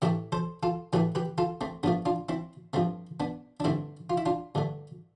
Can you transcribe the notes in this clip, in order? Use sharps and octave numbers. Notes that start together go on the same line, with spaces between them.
A2 E3 A3 E4 G4
A4 C5
F4 A4
A2 E3 A3 G4 B4
G4 B4
F4 A4
A3 C4
G2 F3 A3 B3 D4
D4 F4
C4 E4
G2 F3 A3 C4
B3 D4
D4
G2 D3 A3 C4 E4
F4
E4
D4 F4
G2 D3 A3